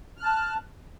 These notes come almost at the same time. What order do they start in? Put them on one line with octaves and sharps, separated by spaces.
F6 F#6 A5